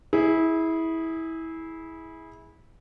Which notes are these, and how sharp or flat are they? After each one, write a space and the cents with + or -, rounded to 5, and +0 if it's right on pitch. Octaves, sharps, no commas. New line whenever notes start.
E4 -20 G#4 +0